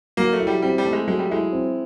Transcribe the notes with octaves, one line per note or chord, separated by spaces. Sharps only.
F#3 A#3
A3
E4
G3
G3 C4
G3
A3
G#3
F#3 G#3
G3
G#3 E4
C4